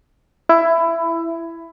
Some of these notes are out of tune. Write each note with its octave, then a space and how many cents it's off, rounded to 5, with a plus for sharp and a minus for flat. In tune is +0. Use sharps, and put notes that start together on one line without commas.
E4 +10